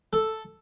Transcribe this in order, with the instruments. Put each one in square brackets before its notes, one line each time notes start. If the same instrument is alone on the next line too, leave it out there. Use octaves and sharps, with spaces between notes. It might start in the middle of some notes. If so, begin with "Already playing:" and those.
[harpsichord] A4